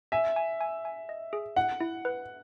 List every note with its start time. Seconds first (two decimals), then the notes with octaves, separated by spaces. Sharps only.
0.12 E5 G#5
0.36 G#5
0.61 G#5
0.85 G#5
1.09 D#5
1.33 G#4
1.56 E4 F#5
1.81 E4
2.05 B4